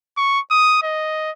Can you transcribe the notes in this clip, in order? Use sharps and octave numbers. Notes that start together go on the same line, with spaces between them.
C#6
D#6
D#5